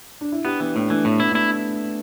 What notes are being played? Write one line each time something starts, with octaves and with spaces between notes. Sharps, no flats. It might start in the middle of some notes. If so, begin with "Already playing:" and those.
D4
E4
B3 D4 G4
E3 B3
A2 A3 D4
E3 A3 D4
A2 D4
B3 E4
A3 D4 E4